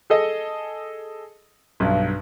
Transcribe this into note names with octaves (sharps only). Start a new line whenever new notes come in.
G#4 A4 D#5
B1 G2